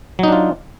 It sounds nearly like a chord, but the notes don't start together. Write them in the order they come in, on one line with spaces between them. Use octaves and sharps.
F#3 D#4 D4 F4